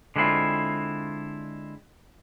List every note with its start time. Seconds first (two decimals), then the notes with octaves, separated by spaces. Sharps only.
0.16 D3 G#3 C4 E4 F4